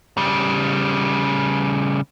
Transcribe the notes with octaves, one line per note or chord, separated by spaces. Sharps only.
C#3 G3